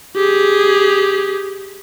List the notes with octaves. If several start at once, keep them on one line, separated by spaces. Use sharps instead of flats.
G4 G#4